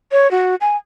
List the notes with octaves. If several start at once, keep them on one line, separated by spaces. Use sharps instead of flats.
C#5
F#4
G#5